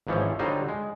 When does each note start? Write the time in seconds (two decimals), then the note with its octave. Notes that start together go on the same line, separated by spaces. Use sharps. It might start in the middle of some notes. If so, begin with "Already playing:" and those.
0.07 G#1 G#2 E3 F3 C#4 C#5
0.39 D3 F#3 G3 D#4 F4 C5
0.69 G#3